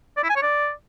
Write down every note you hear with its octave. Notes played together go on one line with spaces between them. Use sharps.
D5
E4
G#5
C#5
D5